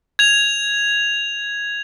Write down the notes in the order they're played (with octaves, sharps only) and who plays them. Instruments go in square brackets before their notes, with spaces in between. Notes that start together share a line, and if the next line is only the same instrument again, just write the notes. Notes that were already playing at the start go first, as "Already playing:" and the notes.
[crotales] G#6 F7